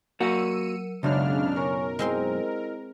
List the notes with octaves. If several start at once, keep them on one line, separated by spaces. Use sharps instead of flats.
F#3 A#3 F#4 A#4 E6 C#7 D#7
B1 F#2 C#3 G#3 D4 D#5 F5 F6
A#4 C#5 G#5 C#6
G#3 C4 E4 D#5 C6